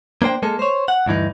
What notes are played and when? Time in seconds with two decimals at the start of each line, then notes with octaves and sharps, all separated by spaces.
0.22 A#3 D4 C5 G5
0.43 G#3 A#3 A4
0.59 C5 C#5
0.88 F#5
1.06 D2 G2 E3 D#4